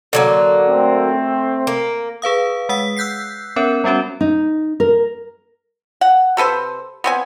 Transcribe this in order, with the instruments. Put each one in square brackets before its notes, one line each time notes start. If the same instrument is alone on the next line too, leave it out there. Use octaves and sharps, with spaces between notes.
[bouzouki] D3 F#3 A#3
[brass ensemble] A3 C4
[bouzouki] A#3
[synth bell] G#4 B4 F5 D#6
G#3 F#5 D#6 B6
E6 F#6 G6 B6 C7
B3 C#4 A#4 C#5
G3 B3 C#4 F#4 C#5
[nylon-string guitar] D#4
A#4
[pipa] F#5
C3 A4 B4 C5
B3 C4 G#5